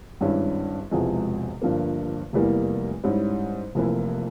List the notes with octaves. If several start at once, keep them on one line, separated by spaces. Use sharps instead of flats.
G#1 G2 G3 C#4 E4
E1 E2 C3 F3 G#3
G1 G2 F3 A#3
F1 E2 E3 G3 A#3
G#2 G3 C#4 E4
F1 F2 E3 A#3 E4